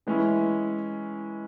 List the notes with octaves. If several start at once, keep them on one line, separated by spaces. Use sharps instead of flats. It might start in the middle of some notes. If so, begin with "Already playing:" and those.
E3 G#3 C#4 E4